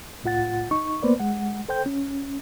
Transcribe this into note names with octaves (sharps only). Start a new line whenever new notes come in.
C2 A2 F4 F#5 A6
D#4 C#6
A#3 B3 B4 C5 D5
G#3 F#5
A4 C5 G5 G6
C#4